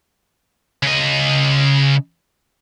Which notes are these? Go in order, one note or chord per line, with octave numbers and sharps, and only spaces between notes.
C#3 D#5